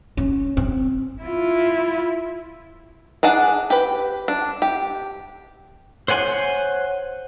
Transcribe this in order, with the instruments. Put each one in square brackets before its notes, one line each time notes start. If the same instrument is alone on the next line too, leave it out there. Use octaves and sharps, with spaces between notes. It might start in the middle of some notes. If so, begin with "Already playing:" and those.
[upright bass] C#4
C4
[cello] E4 F4
[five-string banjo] D4 G#4 F#5 A5
G4 B4
D4
G4
[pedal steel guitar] C5 C#5 F#5 G#5 C6